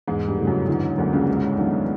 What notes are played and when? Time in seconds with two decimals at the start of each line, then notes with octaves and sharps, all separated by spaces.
0.07 E2 G#2 G#3
0.28 G2 G3
0.38 C#3 E3 A3
0.47 F#2 F#3
0.68 E2 D3 E3
0.98 D2 D3 F#3 A#3
1.13 C#2 C#3
1.28 G#2
1.58 D#3 F#3 B3 D4